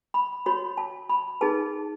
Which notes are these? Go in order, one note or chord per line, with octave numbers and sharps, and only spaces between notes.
B5
F#4 C#5 B5
A5
B5
D#4 G#4 B4 A5